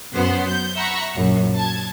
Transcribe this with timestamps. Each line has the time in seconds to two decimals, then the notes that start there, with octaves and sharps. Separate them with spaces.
0.14 F#2 F#3 B3 C5 F#5
0.45 G6
0.75 E5 F#5 A#5 B5 C#6
1.14 A#1 F#2
1.55 A5 G#6